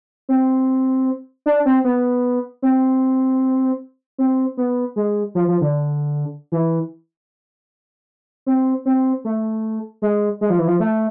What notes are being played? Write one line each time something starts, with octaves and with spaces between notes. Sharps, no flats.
C4
D4
C4
B3
C4
C4
B3
G#3
F3
F3
D3
E3
C4
C4
A3
G#3
G#3
F3
E3
F3
A3